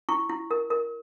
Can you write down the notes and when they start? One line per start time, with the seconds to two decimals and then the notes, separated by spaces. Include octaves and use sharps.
0.09 E4 C#6
0.29 E4
0.51 A#4
0.70 A#4